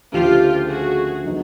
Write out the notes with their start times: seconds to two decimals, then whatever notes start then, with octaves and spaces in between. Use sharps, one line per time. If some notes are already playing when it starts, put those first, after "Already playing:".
0.13 D2 C#3 F3 F4 G4
0.68 F#4 G#4
1.23 D3 F#3 B3 D#4